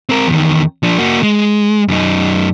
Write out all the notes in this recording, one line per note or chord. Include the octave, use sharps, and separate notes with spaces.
C4 A#4
E2 D#3
F3 D4
A#3 F#4
G#3
F#2 D#4